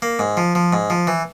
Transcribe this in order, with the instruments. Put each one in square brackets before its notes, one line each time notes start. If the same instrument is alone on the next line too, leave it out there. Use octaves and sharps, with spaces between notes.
[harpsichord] A#3
G#2
F3
F3
G#2
F3
E3